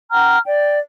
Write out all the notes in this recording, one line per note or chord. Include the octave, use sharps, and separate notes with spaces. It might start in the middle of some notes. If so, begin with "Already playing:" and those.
F#5 G5 A#5 F6
D5 G5